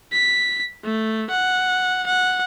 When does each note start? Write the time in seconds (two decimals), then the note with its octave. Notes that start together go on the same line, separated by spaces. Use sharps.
0.12 B6
0.84 A3
1.30 F#5
2.06 F#5